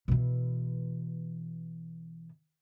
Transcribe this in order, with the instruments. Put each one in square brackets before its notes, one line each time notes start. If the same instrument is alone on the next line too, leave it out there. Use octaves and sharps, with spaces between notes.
[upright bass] B2 E3